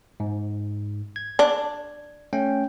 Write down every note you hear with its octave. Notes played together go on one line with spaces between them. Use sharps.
G#2
G#6
D4
A3 C#4 G5